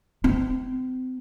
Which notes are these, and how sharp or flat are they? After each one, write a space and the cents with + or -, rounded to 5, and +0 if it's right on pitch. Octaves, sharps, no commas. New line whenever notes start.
C4 -35